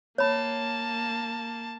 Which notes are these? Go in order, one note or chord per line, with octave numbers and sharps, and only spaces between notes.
A#3 C#5 A5 B5